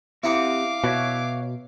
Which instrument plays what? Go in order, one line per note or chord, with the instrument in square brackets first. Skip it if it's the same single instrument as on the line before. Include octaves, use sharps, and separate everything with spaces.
[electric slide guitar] C4 G4 F#5 [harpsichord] E4 A#5 D#6 [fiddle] F5 D6
[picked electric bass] B2 [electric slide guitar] F#4 C#5 E5